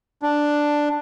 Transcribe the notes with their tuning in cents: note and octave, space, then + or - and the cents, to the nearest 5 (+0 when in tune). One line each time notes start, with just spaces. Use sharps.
D4 +5